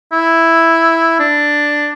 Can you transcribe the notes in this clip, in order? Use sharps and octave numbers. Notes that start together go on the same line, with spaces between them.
E4
D4